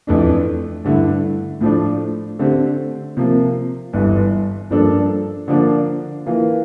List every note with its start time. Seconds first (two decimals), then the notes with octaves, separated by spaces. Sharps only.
0.07 F2 E3 A3 D4
0.84 G2 D3 A3 E4
1.61 A2 F3 A3 D4
2.39 D3 A3 C4 G4
3.17 C3 F3 A#3
3.93 G1 G2 E3
4.70 G2 F3 A#3 D4 A4
5.48 D3 F3 A#3 D4
6.26 E3 A#3 F4